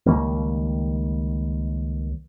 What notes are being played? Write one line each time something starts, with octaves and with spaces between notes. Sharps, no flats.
C#2 D#3 G3 A#3